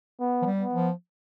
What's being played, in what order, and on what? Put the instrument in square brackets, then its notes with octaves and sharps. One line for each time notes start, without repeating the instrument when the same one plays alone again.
[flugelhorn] B3
[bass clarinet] F3
G3
[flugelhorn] B3
[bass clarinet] F3